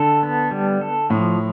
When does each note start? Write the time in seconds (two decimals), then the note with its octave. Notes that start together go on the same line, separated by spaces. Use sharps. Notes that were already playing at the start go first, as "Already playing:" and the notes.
Already playing: D3 A4
0.23 B3
0.51 G3
0.81 A4
1.10 A2 F3